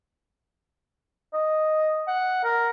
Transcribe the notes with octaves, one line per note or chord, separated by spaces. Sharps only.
D#5
F#5
A#4